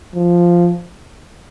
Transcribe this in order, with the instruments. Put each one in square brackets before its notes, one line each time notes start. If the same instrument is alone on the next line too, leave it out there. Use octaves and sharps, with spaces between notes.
[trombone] F3